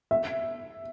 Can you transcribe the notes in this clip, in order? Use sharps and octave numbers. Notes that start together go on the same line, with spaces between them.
E5